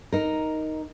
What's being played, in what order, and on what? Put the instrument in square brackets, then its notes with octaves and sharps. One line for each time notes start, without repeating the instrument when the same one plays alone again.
[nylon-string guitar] D#4 A#4